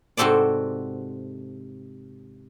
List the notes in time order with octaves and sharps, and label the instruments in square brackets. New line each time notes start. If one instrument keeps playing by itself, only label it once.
[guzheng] G#2 C3 F#4 A4 C5 D5